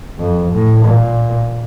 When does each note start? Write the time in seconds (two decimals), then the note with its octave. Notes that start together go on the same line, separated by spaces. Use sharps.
0.19 F2
0.53 A2
0.85 A#2